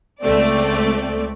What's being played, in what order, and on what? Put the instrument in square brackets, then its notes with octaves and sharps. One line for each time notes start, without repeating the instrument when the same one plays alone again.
[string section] C#2 A3 C4 D5